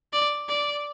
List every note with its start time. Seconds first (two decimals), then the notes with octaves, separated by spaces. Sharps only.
0.13 D5
0.49 D5